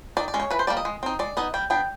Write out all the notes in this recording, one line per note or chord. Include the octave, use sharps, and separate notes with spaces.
D#3 D5
D5
G#3 C#4
C#5
E3 B4
C5
G3 A#3 D5
D#5
G#3
C4 D#4
G#3 D5
B3 D#4 D#5
G3 G5
B3 D4 G5